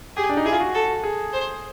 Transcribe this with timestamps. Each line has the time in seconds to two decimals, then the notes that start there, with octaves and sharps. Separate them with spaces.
0.17 G4 G#4
0.29 D4
0.37 D#4
0.45 E4 G#4
0.52 F4
0.60 F#4
0.75 A4
1.04 G#4
1.33 C5